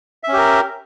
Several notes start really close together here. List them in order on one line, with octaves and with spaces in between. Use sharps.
E5 C#4 G4 A#4